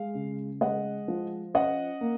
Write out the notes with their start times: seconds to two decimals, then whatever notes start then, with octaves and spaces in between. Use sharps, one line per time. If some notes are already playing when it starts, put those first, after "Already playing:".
Already playing: G#3 F5
0.14 C#3
0.61 G#3 D#5 F#5
1.08 F3
1.54 C#4 D#5 F#5
2.01 A#3